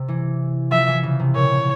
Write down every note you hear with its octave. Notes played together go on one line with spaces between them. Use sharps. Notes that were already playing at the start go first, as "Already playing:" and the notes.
Already playing: C3
E3
F3 E5
E3
C#3
C3
A#2 C#5